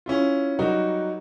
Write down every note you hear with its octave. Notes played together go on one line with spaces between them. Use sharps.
C#4 E4 F4
F#3 G3 D#4 F#4 A#4